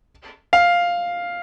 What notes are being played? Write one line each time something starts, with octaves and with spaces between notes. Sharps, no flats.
F5